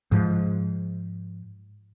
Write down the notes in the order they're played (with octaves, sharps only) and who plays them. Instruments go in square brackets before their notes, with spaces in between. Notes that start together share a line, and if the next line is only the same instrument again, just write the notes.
[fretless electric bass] G#2 F3